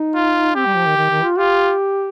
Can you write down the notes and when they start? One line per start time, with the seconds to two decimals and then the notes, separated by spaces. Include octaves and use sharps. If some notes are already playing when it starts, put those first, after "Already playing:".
Already playing: D#4
0.15 F4
0.56 C4 G4
0.66 G3
0.76 F3
0.86 D#3
0.97 D#3
1.10 D#3
1.23 F4
1.38 F4 G4